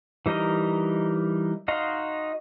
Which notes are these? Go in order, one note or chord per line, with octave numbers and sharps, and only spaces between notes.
E3 G3 D#4 A#4 D#5
D#4 F#4 D#5 F5 C6